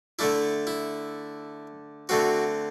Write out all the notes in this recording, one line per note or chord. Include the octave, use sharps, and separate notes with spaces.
D3 A3 D4 E4
E4
D3 A3 C4 F#4